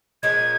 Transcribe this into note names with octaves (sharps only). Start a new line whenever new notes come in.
A#2 F3 G#3 C#4 G#6